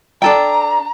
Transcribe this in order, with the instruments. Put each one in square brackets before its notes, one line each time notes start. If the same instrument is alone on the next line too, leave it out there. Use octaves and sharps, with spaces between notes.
[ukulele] D4 A4 G5 [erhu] A#5